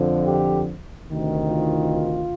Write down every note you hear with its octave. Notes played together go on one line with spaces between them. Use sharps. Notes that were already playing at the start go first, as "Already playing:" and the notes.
Already playing: F2 D3 F3
G4
D2 C3 D#3
F4